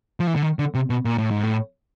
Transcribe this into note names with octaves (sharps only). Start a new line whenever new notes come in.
F3
E3
D3
D#3
D3
C3
B2
A#2
A2
G#2
A2